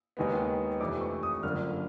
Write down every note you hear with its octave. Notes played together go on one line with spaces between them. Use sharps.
D#2 D#3 G#3 B3
F2 C3 E3 A3 D4 D6
C#6
D#6
G1 F#2 D3 F3 A#3 F6